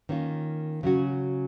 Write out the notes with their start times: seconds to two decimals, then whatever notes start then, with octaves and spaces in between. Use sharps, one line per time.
0.09 D#3 A#3 C#4 F4
0.83 C#3 F#3 C#4 F#4